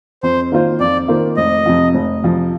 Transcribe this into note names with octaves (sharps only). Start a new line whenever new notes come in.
F2 C5
D#3 A#3 F4 C5
F2 D5
D#3 A#3 F4 C5
F1 D#5
F2 C3 F3
F1
F2 C3 F3